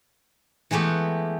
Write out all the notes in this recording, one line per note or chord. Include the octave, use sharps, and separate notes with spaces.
E3 G#3 A3 B3 G4